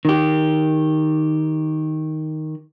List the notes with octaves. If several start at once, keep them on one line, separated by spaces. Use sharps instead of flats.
D#3 G4